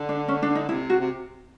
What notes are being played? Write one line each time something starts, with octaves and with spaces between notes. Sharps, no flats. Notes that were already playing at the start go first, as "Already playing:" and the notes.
Already playing: D3
D4
C#4
D4
D#4
C3 E4
F#4
C3